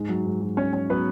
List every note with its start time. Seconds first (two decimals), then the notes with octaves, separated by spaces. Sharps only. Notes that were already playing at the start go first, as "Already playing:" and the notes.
Already playing: G#2 G#3
0.09 F#3
0.26 G#2
0.41 F#3
0.57 C#4 C#5
0.73 C#4
0.89 F#3 B3 B4